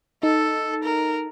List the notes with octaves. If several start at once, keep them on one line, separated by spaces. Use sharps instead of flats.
D#4 A4
A#4